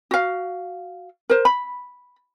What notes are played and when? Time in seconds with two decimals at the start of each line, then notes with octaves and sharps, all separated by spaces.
0.11 F#4 F5
1.30 A#4 C5
1.45 B5